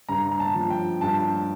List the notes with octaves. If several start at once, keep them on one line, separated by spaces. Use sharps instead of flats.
G2 A#5
A#5
A5
F3
G5
G2 A5